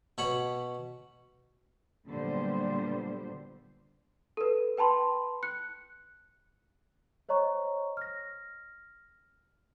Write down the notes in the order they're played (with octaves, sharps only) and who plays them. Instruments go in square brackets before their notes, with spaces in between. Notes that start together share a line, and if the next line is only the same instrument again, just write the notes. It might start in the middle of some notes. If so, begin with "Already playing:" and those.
[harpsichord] B2 C#5 B5
[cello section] A#2 D3 F#3 G3 B3 C5
[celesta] A4 B4
B4 G5 A5 B5 C6
F#6 C#7
C5 C#5 D#5 A#5 C#6
F6 A#6